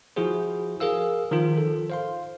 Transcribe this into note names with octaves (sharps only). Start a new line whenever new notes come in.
F3 E4 F#4 G#4 C5
G#4 A#4 F5 E6
D#3 F3 F4
A4
C5 F5 C6